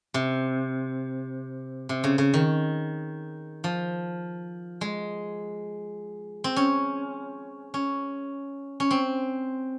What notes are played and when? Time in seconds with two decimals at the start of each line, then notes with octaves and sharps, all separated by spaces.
0.14 C3
1.89 C3
2.04 C#3
2.18 C#3
2.34 D#3
3.64 F3
4.81 G#3
6.44 C4
6.56 C#4
7.74 C#4
8.80 C#4
8.91 C4